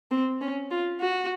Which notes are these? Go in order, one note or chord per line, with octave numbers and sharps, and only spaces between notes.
C4
C#4
F4
F#4